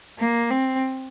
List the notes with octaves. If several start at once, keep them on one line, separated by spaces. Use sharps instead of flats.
A#3
C4